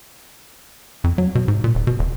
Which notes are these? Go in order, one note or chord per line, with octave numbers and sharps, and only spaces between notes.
F2
F#3
B2
G#2
A#2
D#1
B2
D#1